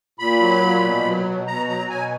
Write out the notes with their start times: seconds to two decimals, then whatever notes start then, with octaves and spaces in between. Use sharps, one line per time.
0.19 A#2 B5
0.40 F#3
0.62 A#2
0.83 B2
1.04 F#3
1.26 B2
1.47 B2 A#5
1.68 F#3 A#5
1.90 B2 G#5